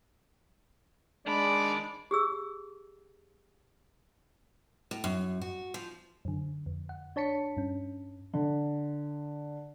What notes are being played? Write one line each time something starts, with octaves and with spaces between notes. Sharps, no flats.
D#3 G#3 D4 D5 B5
G4 G#4 E6
A2
F#2
F#4
F3
F#2 D3
F2
F#5
D4 C#5 A5 B6 C#7
G2 C#4
D3